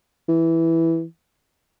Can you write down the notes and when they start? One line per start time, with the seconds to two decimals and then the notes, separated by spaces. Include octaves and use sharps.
0.28 E3